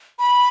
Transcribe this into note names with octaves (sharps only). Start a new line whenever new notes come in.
B5